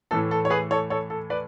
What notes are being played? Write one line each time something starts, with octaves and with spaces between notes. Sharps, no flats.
A2 E3 A3 A4
A4
C#5
G#4 B4
A4 C#5
A4 C#5
A4
B4 D5